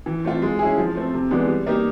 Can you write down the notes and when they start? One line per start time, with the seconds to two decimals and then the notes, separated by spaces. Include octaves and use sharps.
0.06 E3
0.25 A3 C4 F4
0.42 G#3
0.59 C#4 E4 G#4
0.78 F3
0.95 A3 C4
1.13 C3
1.31 E3 G#3 B3 D4
1.48 G3
1.66 A#3 D#4 G4